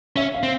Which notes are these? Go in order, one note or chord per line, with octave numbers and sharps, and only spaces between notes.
C#4 E5
F5
C4